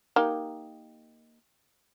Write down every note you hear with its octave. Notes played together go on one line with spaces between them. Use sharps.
A#3 D#4 G4